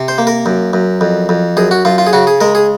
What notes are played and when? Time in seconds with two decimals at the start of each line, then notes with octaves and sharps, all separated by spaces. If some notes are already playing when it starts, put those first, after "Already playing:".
Already playing: C3
0.08 C5
0.18 A#3
0.27 A#4
0.46 F#2
0.73 F#2
1.01 F2
1.29 F2
1.57 F#2 G#4
1.71 F#4
1.85 F#2 F4
1.98 F4
2.07 G#4
2.13 C#3 F#4
2.27 G#4
2.41 G#3 A#4
2.55 G#4